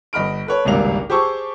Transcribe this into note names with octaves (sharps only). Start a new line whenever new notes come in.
G1 D#5 B5 F6 D7
A4 B4 C#5
G#1 C#2 G2 C3 A#3 F7
G4 G#4 C5 A5 C#6 E6